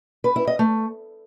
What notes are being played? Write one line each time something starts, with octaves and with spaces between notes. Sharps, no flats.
B4
E4
D#5
A3